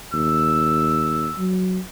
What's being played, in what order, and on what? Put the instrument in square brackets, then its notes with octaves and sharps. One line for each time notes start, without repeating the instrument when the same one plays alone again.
[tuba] D#2 [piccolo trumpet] E6
[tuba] F#3